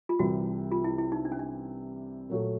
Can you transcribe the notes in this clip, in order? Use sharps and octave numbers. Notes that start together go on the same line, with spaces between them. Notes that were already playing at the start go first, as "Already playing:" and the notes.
F4
C2 C3 E3 G3 F#4
F4
E4
E4
D#4
D4
C#4
D4
A#2 F#3 A3